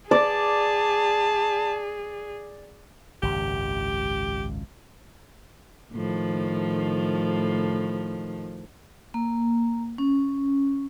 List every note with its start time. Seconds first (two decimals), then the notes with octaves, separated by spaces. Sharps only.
0.11 G#4 D5 A5
3.23 G#1 C#2 F#2 G4
5.93 A2 D#3 F3
9.14 A#3
9.98 C#4